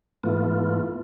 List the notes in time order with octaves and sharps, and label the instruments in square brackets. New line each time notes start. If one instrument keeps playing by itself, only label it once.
[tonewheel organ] G#2 E3 A3 B3 F4